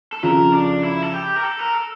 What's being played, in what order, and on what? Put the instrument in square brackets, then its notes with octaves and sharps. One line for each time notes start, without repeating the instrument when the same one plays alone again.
[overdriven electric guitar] A4
[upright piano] F2 C#3 F3 C#4 F4 [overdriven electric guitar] A#4
[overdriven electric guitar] D4
E4
A4
G4
A#4
A4
A#4
A4